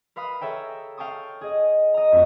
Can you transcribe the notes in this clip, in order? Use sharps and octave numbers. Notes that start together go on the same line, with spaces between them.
A#4 B4 F5 B5 D#6
G#4 A4 C#5 E5 G5 A#5
F5 G5 A5 C#6 D#6
G#4 D#5
D#5 A#5
F2 A3 F#4